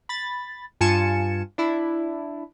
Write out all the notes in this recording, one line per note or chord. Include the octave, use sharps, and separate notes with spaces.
B5 A6
G2 F4 G#5 A5 C#7 E7
D4 E4